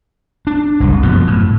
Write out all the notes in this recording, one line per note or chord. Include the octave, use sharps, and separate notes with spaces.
D4
F#1 C2
F#2 B2 F3
A2